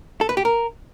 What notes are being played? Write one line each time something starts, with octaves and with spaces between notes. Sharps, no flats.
A4
B4
G4
A#4